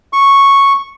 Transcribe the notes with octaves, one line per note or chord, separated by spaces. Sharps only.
C#6